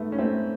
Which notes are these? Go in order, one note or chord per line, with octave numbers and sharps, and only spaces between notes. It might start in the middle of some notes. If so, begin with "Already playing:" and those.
Already playing: G#2 A3 B3
C#4
A3 C4